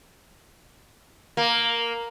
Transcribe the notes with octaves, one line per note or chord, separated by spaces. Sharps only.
A#3